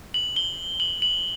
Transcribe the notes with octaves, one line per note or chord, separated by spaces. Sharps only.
F#7
G7
F#7
F#7